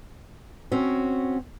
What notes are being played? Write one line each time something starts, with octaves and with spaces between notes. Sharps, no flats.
C4 C#4 F#4